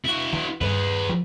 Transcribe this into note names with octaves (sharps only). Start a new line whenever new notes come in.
E4 F#4
E3
G2 G#4 B4
F3